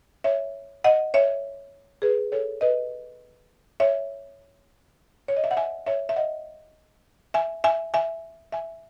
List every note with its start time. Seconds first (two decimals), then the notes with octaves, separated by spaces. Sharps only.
0.24 C#5 E5
0.84 D#5 F#5
1.14 C#5 E5
2.02 G#4 B4
2.32 A4 C#5
2.61 B4 D#5
3.80 C#5 E5
5.28 C#5
5.37 D#5
5.44 E5
5.51 F#5
5.57 E5 G#5
5.86 C#5 E5
6.09 E5
6.16 D#5 F#5
7.34 E5 G#5
7.64 E5 G#5
7.94 E5 G#5
8.52 E5 G#5